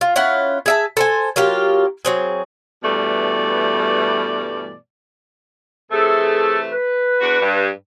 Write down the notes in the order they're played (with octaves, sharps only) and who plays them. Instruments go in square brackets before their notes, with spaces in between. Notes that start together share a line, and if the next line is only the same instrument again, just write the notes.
[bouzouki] F4
C#4 E4 F4 F#5
G#4 E5 A5
A4 C5 G#5
F#3 A#3 F4 G4
F#3 C4 G#4
[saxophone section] G2 B2 E3 G3 A3 D5
[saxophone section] C3 E3 A3 [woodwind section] G#4 A4
[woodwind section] B4
[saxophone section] E2 D4 F#4
G2